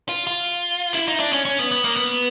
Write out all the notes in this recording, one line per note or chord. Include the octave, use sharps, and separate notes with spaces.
F4
F4
E4
D#4
D4
C#4
C#4
B3
B3
A#3
B3